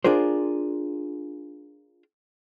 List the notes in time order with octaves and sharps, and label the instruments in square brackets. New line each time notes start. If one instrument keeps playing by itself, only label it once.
[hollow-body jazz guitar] D4 F4 G#4 A#4 C5